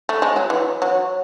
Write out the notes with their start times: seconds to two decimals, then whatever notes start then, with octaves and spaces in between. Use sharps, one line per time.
0.09 A3
0.22 G#3
0.36 F#3
0.50 E3
0.82 F#3